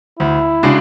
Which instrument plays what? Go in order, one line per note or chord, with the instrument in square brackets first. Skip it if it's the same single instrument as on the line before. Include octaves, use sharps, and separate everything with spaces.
[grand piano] D2 [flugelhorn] E4
[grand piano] C#3 G#3 D4 F#4